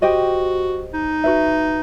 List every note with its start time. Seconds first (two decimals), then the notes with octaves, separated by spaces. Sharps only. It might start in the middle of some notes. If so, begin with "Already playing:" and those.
0.02 F#4 G4 C5 D#5 G5
0.94 D#4
1.24 F#4 B4 E5